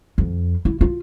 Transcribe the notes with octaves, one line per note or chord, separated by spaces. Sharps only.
F2
E4
F4